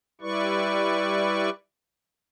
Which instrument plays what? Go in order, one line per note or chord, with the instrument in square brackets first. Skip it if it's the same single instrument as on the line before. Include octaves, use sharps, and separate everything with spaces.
[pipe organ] G3 E4 B4 D5 C#6